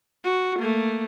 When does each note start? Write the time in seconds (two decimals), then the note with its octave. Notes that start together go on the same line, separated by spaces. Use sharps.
0.24 F#4
0.59 A3 A#3